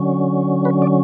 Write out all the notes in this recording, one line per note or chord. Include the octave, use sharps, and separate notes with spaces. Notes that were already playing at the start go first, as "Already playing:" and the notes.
Already playing: D3 F#3 C#4
B4
D5